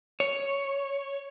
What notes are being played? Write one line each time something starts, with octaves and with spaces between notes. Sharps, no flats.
C#5